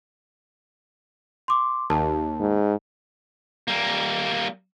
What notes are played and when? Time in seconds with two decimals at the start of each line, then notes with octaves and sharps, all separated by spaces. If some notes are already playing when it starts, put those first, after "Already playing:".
1.48 C6 D6
1.90 D#2 A5
2.40 G#2
3.68 G3 A#3